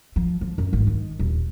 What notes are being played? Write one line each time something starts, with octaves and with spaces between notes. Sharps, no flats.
F3
F3
F#2
G#1
D#3
D#1